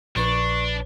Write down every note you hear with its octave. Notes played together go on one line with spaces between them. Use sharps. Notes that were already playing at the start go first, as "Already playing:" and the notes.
A#1 D4 B4 C#6